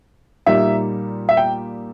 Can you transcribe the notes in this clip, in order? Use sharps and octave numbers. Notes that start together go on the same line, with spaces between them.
A#2 G3 A#3 D#4 E5
E5
G5